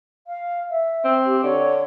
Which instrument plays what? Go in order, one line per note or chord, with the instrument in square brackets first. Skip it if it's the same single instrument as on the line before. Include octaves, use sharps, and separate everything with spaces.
[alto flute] F5
E5
[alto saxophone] C4
[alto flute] G4
[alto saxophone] D3 [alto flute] C#5